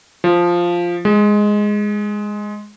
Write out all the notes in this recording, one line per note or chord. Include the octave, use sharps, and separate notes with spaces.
F3
G#3